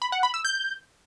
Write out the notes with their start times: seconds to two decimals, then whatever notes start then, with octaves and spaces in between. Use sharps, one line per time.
0.02 B5
0.12 F#5
0.23 B5
0.34 E6
0.45 G6